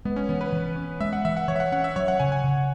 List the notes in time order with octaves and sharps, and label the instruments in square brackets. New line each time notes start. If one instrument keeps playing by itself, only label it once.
[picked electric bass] G#3 [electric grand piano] B3
[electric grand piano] C#4
[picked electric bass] E3 [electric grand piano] B3
[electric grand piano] B4
[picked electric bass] E3
C#4
[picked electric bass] G#3 [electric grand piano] E5
[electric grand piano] F#5
[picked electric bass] E3 [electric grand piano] E5
[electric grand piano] F#5
[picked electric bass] E3 [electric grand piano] C#5
[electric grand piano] E5
F#5
[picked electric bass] C#4 [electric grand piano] F#5
[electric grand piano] E5
[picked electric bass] F#3 [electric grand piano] C#5
[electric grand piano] F#5
[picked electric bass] C#3 [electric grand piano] G#5
[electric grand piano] G#5
[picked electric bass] C#3